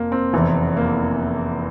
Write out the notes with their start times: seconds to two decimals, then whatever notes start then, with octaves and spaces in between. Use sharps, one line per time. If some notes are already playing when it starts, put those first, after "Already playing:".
Already playing: F1 F2 A#3
0.12 C4
0.33 F1 E2 E3
0.77 A#3